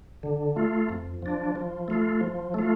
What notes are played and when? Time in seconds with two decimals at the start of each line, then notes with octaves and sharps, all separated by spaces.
0.23 D3
0.56 A3 F4
0.89 F2
1.22 F3 D4
1.55 F3
1.88 A3 F4
2.21 F3
2.54 A3 F4